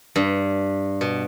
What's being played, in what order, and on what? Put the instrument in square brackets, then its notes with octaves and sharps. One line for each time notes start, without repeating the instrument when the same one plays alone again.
[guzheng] G2
B2